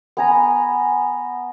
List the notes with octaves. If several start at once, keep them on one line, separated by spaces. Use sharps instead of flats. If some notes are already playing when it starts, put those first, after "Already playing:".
B3 G#5 A#5